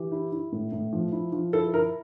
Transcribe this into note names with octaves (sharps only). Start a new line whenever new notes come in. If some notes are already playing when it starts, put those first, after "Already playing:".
Already playing: E3 G4
E4
E4
A2
A2
F3
E4
F3
E4 A4
E4 A#4